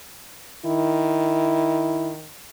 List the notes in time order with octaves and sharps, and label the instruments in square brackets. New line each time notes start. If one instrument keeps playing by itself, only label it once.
[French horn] D#3 [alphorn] E4